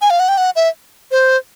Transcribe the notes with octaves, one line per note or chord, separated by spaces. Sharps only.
G#5
F5
F#5
G5
F#5
E5
C5